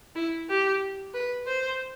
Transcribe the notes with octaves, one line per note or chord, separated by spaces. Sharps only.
E4
G4
B4
C5